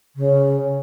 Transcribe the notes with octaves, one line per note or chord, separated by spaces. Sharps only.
C#3